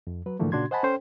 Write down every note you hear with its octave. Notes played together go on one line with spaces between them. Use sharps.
F2
F#3 B4
G#2 D3 E3 F3 A3 A#3
A#2 C#3 D4 F#4 C6 G#6
C5 D#5 F#5 G#5 A5 B5
C#4 A4 C5 G5